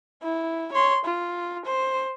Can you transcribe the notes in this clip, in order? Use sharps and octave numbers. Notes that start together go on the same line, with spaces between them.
E4
C#5 C6
F4
C5